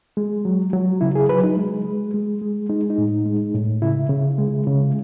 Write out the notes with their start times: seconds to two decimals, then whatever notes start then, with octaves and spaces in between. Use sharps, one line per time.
0.17 G#3
0.45 F#3
0.73 F#3
1.01 C#3 E4
1.15 G#4
1.29 F#3 B4
1.43 D#4
1.57 G#3
1.85 G#3
2.14 G#3
2.42 G#3
2.69 G#3 D#4
2.90 D#4
2.98 A2
3.26 G#3
3.54 A2
3.82 C#3 E4
4.10 C#3
4.38 G#3
4.67 C#3